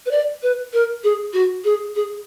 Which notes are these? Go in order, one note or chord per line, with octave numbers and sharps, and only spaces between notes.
B4
D5
B4
A#4
G#4
F#4
G#4
G#4